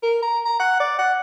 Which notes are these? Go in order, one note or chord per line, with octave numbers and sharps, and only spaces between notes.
A#4
A#5
A#5
F#5
D5
F#5